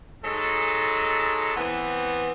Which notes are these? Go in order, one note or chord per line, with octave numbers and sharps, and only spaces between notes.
F#3 G#3 D#4 A4
E3 B3 C4